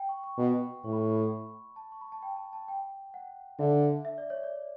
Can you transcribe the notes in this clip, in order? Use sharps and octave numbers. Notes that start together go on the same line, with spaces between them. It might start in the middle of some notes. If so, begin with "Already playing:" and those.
Already playing: G5
C#6
C#6
B2
A2 C#6
B5
C#6
A5
C#6
B5
A5
G5
A5
A5
G5
F#5
D3 E5
E5
D5
C#5
D5